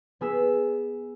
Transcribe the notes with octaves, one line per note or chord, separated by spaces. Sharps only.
B3 G#4 E6 B6